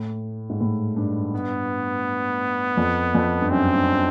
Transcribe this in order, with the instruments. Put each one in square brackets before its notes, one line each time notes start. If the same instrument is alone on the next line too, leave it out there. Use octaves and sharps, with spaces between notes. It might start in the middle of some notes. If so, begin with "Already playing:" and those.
Already playing: [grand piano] A2
G#2
A2
G2
[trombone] B3
[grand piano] F2
F2
G2
[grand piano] F#2 [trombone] C4
[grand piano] G2